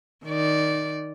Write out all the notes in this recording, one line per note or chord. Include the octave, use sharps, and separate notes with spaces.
D#3 D5